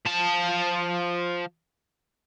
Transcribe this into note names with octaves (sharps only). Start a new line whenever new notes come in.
F3 A5